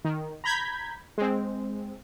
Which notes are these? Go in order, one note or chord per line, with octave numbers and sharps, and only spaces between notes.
D#3
A#5 B5 G6 G#6 B6
G#3 C4